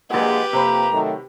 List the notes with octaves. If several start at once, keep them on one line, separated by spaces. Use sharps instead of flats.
A#1 G#3 A#3 G4 G#4 B4 F#5
F2 C3 A#3 C5 A#5 B5
D#3 F#3 A3